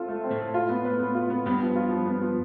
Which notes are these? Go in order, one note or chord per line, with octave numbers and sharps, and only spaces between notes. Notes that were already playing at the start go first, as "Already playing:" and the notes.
Already playing: C4 F4 A4
A3
C4
A2 A3
A4
F4
B3
B4
B3
F4
B3
G2 G3 B3
F3
F4
F3
B3
F3